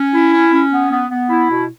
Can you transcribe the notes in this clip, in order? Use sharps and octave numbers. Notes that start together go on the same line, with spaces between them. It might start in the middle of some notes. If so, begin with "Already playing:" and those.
Already playing: C#4
E4
C#4
C#4
B3
B3
B3
E4
B2